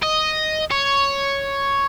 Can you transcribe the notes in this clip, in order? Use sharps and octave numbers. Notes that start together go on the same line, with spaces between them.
D#5
C#5